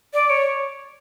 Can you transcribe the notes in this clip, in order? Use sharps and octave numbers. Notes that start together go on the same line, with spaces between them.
D5
C#5